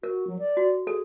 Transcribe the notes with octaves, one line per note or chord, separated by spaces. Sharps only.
F#4 A#4
F#3
D5
F#4
G#4 A4